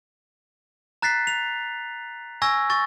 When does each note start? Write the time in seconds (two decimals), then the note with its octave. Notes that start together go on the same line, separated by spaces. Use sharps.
1.02 A#5 F#6 A6 B6 C7
1.27 F7
2.42 G#5 C#6 E6 G#6 A#6
2.70 C#6 A6